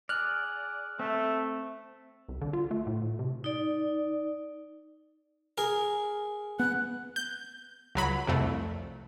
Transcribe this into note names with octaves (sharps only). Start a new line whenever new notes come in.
G#4 D5 F6 F#6
A3 C4 E5
C2
D3
F4
A3
A2
C3
D#4 D5
G#4 A#4
B3 F#6
G6
C#2 F#3 B5
C2 F2 A3